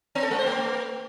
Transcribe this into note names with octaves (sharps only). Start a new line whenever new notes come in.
B3
A4
G#3
C5
A3